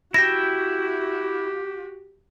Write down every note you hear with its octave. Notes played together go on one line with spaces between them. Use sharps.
E4 F#4 G4 E5 G5 A#6